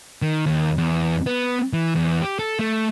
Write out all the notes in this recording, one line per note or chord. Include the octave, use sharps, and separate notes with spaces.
D#3
D#2
E2
B3
E3
E2
G4
A4
A3